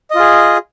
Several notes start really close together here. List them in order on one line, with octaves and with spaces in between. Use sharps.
D#5 F4 G#4